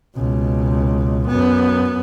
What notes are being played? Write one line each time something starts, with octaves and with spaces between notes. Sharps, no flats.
C#2 B2
F#2 B3